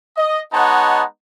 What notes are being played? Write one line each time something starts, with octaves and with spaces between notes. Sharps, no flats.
D#5
G#3 B3 D#4 C#5 F#5 A5